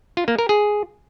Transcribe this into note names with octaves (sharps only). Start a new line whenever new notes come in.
F4
A#3
A#4
G#4